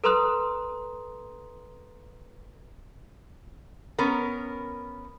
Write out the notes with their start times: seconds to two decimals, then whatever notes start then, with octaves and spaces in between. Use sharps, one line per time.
0.04 A4 B4 A#5 C6 D#6 F#6
3.98 B3 C#4 A#4